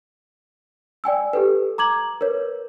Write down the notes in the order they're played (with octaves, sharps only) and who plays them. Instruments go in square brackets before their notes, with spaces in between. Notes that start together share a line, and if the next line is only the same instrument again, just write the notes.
[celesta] D5 G5 G#5 E6
G4 A4 B4
A#5 D6 G#6 F#7
A#4 B4 C#5